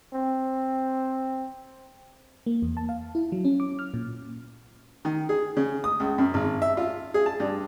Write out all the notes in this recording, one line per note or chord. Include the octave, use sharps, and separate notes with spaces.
C4
A#3
E2
A5
F5
E4
F#3
C#4
D6
F6
A#2
D#3
G#4
C#3
D#6
C#2
F#2
G#1
E5
F4
G#4
A5
G2